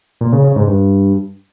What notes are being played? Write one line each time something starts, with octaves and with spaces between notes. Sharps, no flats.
A#2
C#3
C#3
G#2
G2